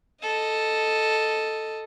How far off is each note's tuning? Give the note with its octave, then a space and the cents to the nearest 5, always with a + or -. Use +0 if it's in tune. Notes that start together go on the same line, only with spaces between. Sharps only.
A4 +0 D#5 +0